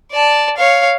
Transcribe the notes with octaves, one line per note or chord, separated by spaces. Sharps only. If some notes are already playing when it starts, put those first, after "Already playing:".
D5 A5
C#5 F5